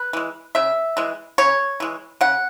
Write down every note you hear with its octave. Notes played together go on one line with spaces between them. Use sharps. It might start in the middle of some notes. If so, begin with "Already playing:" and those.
Already playing: B4
E3 G#3
C#3 E5
E3 G#3
C#3 C#5
E3 G#3
C#3 F#5